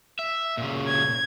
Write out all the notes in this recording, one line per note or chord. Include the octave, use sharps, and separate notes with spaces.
E5
A#2 C#3
G#6